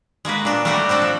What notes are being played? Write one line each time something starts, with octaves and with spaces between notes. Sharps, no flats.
G#3 A#3 F#4 B4
A#2 D4
G3 A3 A#3 D4 F#4 G4
C4 D4 F#4 A4
F3